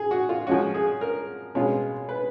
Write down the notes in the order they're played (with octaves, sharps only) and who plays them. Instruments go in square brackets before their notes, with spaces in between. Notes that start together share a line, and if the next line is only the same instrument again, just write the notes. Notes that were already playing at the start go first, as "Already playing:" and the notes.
Already playing: [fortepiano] G#4
F#4
F4
F3 G#3 C#4 F#4
G#4
A#4
B2 G#3 C#4 F4
B4